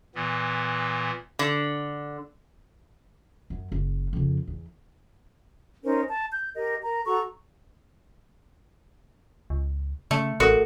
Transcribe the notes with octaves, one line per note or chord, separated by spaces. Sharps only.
A#2 E3 B3
D3
F#2
F#1
F2 C#3
E2
C#4 D#4 A#4 C5
A5
G6
G4 A#4 D#5
A#4 A#5
F#4 A4 A#5 C#6
C#2
C#3 A3
A1 F#4 A4 A#4